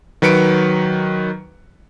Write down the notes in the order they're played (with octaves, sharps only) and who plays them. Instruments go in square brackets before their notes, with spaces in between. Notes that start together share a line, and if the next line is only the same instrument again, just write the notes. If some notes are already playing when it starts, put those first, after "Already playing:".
[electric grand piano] D#3 F#3 B4 C#7 D7